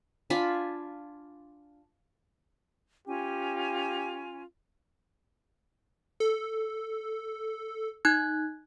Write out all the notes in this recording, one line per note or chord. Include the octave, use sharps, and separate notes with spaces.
D4 F4 G#5 B5
C#4 F4 G4 G#5
A4
D#4 F#6 G#6